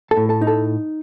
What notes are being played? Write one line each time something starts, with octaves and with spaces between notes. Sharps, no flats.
A4 A5
A2
A4 A5
D#4
A4 A5